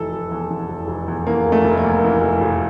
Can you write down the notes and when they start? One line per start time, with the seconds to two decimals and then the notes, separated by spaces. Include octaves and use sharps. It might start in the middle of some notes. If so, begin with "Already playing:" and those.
Already playing: F1 E3 A4
0.12 F1
0.31 E2
0.51 E3
0.69 F1
0.88 F1
1.08 E2
1.27 E3 A#3
1.46 F1
1.52 A3
1.65 F1
1.77 A#3
1.84 E2
2.04 E3
2.22 F1
2.41 F1